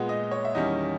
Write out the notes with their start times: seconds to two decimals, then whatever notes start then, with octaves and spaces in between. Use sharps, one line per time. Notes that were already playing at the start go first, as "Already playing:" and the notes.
Already playing: A#2 G#3 B3
0.09 D#5
0.31 C#5
0.45 E5
0.55 E2 D#3 G3 C#4 D#5